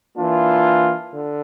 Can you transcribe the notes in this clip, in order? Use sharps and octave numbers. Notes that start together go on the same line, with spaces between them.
E3 A#3 D4 F4
D3